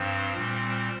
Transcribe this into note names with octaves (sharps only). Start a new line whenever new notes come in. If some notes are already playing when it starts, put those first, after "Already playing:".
Already playing: G2 F3 C4 C5
A#2 G3 C4